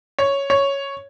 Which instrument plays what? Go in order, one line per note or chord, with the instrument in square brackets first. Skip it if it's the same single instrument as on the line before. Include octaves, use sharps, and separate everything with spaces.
[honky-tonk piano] C#5
C#5